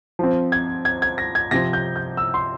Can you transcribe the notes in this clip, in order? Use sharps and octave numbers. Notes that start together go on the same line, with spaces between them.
F3 C4
G#6
G#6
G#6
A#6
G#6
C3 F3 C4 A#6
G6
G6
E6
C6